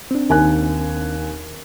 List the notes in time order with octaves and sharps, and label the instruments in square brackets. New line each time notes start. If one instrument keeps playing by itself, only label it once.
[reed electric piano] C4 D4
[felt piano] D#2 G#5 F#6